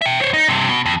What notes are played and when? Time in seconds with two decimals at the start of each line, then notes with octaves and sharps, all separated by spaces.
0.01 E5 G5
0.20 C5 C#5
0.33 D#4
0.49 G2 C3
0.69 B2
0.86 F2